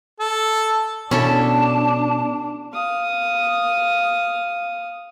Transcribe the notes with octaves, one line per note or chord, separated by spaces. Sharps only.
A4
B2 C#4 D4 E4 A4 A5
F5 D#6